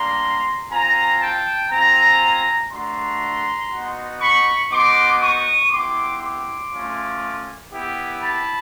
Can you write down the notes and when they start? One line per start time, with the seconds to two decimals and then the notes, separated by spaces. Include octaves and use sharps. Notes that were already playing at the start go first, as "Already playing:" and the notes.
Already playing: G3 A#3 D4 A#5 C6
0.71 C4 F4 G#5 A#5
1.21 G5 A5
1.71 C4 F4 G#5 A#5
2.71 A3 D4 F#4 A#5 C6
3.71 B3 D#4 F#4
4.21 B5 C#6
4.71 B3 D#4 F#4 C6 D6
5.21 C#6 D#6
5.72 B3 E4 G4 C6 D6
6.22 C6 D6
6.72 A3 C#4 F4
7.72 B3 E4 G4
8.22 A5 B5